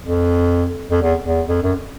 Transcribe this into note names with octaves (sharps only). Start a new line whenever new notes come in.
F2
F2
E2
E2
F2
F#2